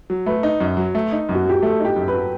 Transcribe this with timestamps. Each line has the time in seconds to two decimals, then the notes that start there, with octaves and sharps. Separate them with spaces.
0.10 F#3
0.26 A3 B4
0.43 D#4
0.60 F#2
0.77 F#3
0.95 A3
1.12 D#4
1.29 F#2
1.35 F#4
1.46 F#3 G4
1.62 A3 A4
1.80 D#4
1.85 G4
1.96 F#2
2.08 B4
2.14 F#3